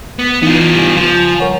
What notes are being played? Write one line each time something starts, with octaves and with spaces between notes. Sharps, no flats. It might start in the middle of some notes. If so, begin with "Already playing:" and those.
B3
E3 B3 D#4 F4
C#3 G3 G#5
F3
A#4 C#5 F#5